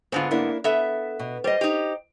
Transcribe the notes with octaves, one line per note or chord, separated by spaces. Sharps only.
G#2 D3 B3 C4 F4
A#3 D4 E4
B3 A4 E5
B2
G3 C5 D#5
D#4 G4